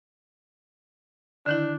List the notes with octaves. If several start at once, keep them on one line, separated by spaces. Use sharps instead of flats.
D3 D#3 D4 E4